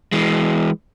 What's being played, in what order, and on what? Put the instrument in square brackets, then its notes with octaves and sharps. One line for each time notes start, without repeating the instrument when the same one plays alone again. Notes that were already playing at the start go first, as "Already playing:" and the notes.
[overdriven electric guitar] E3 G#3